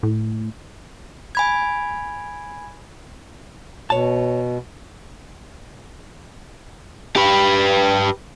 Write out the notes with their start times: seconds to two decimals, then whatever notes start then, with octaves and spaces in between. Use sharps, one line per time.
0.03 A2
1.35 G#5 B5 G#6
3.90 B2 C#5 A5
7.16 G4 B4